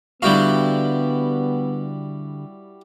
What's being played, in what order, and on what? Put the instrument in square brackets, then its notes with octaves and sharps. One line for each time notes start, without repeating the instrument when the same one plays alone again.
[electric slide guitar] D3 G4 F5 [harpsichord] G3 E4 F#4 [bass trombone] B3